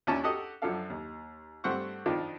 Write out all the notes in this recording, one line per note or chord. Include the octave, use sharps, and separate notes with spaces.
D#2 C#4 D4 E4 A5 C#6
F#4 G4 A4 D#5 F#5
F#2 F3 D4 A4 F5
D#2
G2 A3 C4 C5 F#5 C#6
F2 D#3 F3 D4 F4